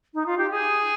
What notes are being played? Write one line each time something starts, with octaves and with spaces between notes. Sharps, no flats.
D#4
F4
G4
G#4